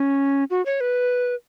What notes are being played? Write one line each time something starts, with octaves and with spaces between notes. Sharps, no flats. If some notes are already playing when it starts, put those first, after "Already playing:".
Already playing: C#4
F#4
C#5
B4